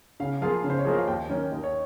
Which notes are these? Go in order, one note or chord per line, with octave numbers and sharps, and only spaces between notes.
C#3 F5
F3 A#3 F4 G#4 F5
C#3
C5
C#5
F3 A#3 F4 G#4 D#5
F5
D#2 G5
D#3 A#3 C#4
D#2 D#5
C#5